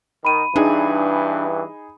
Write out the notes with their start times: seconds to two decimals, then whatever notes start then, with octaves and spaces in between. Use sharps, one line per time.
0.25 D#3 B5 D#7
0.56 G2 E3 D4 D#4 G#4